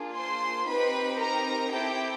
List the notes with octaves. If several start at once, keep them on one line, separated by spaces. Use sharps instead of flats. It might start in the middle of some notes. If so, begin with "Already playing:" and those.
Already playing: A#3 D4 F4 G#4
C5 C6
C4 D#4 G4 B4 B5
A#4 A#5
C4 E4 G4 A4 G5